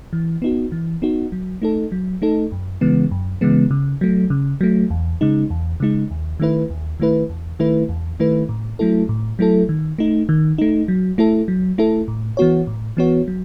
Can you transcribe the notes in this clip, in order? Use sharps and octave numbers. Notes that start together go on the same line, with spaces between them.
E3
B3 D#4 F#4
E3
B3 D#4 F#4
F#3
A3 D#4 A4
F#3
A3 D#4 A4
F#2
C#3 E3 G#3 B3
F#2
C#3 E3 G#3 B3
C#3
F#3 A3
C#3
F#3 A3
E2
C#3 G#3 D#4
E2
C#3 G#3 D#4
D#2
D#3 A3 E4 B4
D#2
D#3 A3 E4 B4
E2
D#3 A3 E4 B4
E2
D#3 A3 E4 B4
A2
F#3 A3 E4 A4
A2
F#3 A3 E4 A4
D#3
A3 D#4
D#3
A3 D#4
F#3
A3 E4 A4
F#3
A3 E4 A4
A2
E3 B3 F#4 C#5
A2
E3 B3 F#4 C#5
F#3